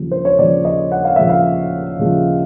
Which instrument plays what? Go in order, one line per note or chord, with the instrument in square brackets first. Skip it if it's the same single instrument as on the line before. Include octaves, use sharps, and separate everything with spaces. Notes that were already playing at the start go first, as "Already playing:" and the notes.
Already playing: [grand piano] D#2 C#3 F3
C5
C#5
D#2 C#3 F3 D5
D#5
F#5
F5
D#2 C#3 F3 E5
F5
D#2 C#3 F3